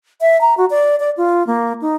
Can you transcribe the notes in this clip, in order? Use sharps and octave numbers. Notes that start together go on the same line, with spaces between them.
E5
A#5
F#4
D5
D5
F4
A#3
D#4